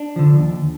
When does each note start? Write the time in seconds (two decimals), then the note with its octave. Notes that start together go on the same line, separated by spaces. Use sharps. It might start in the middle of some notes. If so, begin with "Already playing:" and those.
Already playing: D4
0.16 D3 F3
0.39 D#2